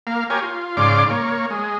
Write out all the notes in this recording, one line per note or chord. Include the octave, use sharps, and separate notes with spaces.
A#3 F5
G4 A#4 C#5 G#5
F4
G#2 C#3 D5 F5 C6 D6
A#3 C#5
G#3